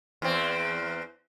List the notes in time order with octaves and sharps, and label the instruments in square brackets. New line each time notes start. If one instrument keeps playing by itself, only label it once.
[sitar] E2 C4